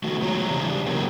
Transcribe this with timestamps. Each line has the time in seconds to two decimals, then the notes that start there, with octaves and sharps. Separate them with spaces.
0.04 D#3 A3 F#4
0.21 F2 B2 F#3 G#3 C#5 A#5
0.51 C#3 E3 G3 D4 G4
0.86 F#3 A#3 C4 C#4 G4